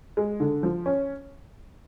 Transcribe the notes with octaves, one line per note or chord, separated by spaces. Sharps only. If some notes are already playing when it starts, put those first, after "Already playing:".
G#3
D3
F3
C#4